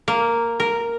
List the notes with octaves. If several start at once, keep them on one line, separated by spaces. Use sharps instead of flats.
A#3
A#4